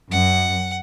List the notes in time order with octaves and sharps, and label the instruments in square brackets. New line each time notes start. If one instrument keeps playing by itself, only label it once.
[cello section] F#2 [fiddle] F#5